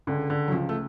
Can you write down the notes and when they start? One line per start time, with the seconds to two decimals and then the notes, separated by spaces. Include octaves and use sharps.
0.07 C#2 D3
0.30 D3
0.48 F#3
0.52 C#2 F3
0.69 A3